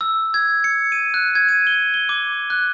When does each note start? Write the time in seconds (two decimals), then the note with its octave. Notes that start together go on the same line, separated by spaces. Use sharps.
0.01 E6
0.34 G#6
0.64 C#7
0.92 D#7
1.14 F#6
1.35 G#6
1.49 D#7
1.67 G7
1.94 G7
2.09 D6
2.50 F#6